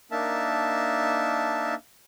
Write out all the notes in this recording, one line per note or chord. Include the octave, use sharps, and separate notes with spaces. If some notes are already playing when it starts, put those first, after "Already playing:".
A#3 D4 D#4 A#4 E5 A5